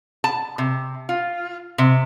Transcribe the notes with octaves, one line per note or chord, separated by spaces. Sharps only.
A5
C3
F4
C3